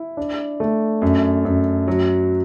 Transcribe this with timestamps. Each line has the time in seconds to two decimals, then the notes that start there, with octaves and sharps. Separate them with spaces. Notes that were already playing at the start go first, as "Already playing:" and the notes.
Already playing: E4
0.17 D4
0.60 A3
1.02 F#2
1.45 F#2
1.87 F#3